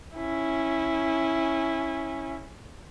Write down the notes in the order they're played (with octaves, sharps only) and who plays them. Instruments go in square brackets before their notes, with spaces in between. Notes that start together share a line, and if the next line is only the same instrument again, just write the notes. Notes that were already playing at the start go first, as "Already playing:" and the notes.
[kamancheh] C#4 E4